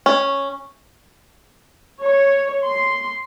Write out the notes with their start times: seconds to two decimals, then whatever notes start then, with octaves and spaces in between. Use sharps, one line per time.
0.06 C#4
2.02 C#5
2.64 C6